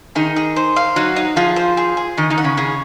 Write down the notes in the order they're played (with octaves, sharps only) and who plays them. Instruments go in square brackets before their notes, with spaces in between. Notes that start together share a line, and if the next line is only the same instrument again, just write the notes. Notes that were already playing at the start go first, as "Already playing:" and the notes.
[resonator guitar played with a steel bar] D#3 D#4 [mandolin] G#4
[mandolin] G#4
C5
F5
[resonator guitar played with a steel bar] F#3 F#4 [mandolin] D#4
[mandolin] D#4
[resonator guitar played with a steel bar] F3 F4 [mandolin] G#4
[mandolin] C5
G#4
G#4
[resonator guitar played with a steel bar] D#3 D#4 [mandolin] D#5
[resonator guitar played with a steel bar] D#3 D#4
[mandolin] F#5
[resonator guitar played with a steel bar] C#3 C#4
[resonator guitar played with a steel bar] C#3 C#4 [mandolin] G#4